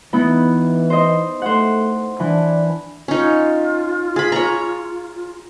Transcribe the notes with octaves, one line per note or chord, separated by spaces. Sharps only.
E3 B3 D#4 E4
C5 D#5
A3 C5 F#5
E3 D4
C#4 D#4 F4
G#4 B5
C#5 A#5